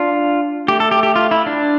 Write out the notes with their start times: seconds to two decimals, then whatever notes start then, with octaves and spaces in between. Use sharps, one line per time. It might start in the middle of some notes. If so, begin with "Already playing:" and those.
Already playing: D4 F4
0.67 A3 G4
0.80 A4
0.91 G4
1.03 G4
1.16 F4
1.31 E4
1.46 D4